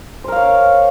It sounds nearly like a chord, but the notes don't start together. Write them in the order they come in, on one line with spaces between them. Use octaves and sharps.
C5 A#4 F5 C#5